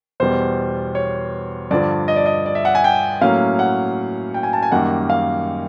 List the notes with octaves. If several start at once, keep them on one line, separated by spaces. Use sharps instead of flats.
E2 B2 G3 C5
C#5
G2 D3 F3 D5
D#5
D5
D#5
D5
E5
F#5
G#5
G5
A2 F#3 A#3 C#4 F5
F#5
G5
G#5
A5
G#5
F#2 D#3 G3 A#3 F#5
F5